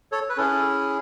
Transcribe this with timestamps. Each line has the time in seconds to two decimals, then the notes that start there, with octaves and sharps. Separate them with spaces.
0.12 A4 C#5
0.29 B4
0.37 C#4 E4 G#4 A4